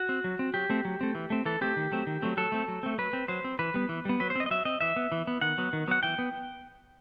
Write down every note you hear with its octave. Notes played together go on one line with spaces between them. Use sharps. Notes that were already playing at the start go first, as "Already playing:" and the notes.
Already playing: F#4
C4
F#3
C4
F#3 G4
A3 C4
F#3
A3 C4
E3
A3 C4
E3 A4
A3 C4 G4
D#3
F#3 A3 C4
D#3
F#3 A3 C4
F#3 A4
A3 C4
F#3
A3 C4
F#3 B4
C4
F#3 C5
C4
E3 B4
G3 B3
E3
G3 B3
F#3 B4
C5
C4 D#5
D#5
F#3 E5
C4 D#5
E3 E5
B3
E3
B3
D#3 F#5
F#3 B3
D#3
F#3 B3 F#5
E3 G5
B3